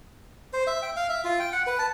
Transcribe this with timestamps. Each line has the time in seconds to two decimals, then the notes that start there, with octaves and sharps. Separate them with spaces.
0.53 C5
0.67 E5
0.82 G5
0.96 F5
1.09 E5
1.24 F4
1.40 G5
1.53 F#5
1.67 B4
1.79 A5